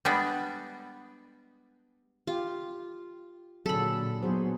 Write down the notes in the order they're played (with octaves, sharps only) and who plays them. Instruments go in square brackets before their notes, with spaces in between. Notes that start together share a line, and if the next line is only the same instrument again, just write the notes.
[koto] G3 G#3 B3 D4
[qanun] F4 [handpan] G4
[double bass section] A#2 D3 [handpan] F#3 G#4 [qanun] A4 B5
[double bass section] A#2 F#3 B3 [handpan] D#4 G#4 C5